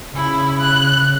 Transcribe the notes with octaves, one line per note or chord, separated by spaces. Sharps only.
C#3 E4
F#6